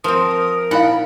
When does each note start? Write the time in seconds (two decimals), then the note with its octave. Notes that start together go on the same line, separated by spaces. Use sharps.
0.04 F3 C4 A#4 D#6
0.71 A#2 D#4 E4 F5 F#5 B5